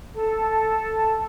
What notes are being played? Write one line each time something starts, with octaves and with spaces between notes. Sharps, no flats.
A4 A5